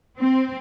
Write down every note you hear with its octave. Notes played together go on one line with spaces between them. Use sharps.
C4